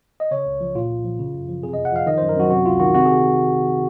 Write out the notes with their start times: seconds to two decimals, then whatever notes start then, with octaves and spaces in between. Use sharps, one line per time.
0.20 D#5
0.31 C#3 C#5
0.46 C#2
0.61 F3
0.75 A#2 F4
0.90 C2
1.05 F3
1.19 C#3
1.34 F#2
1.49 F3
1.63 C3 G#4
1.73 F2 D#5
1.85 F#5
1.92 F3 F5
2.07 D#3 D#5
2.18 F#2 C5
2.29 A#4
2.36 F#2 F#4
2.51 C3 F#4
2.65 C#2 F4
2.80 D#3 F#4
2.94 C3 F#4
3.05 G#4